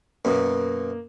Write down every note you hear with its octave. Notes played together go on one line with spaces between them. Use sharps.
F#2 B2 A#3